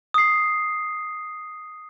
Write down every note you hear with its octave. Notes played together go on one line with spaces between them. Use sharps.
D#6 C7